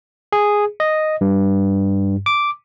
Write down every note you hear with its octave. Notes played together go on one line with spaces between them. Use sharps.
G#4
D#5
G2
D6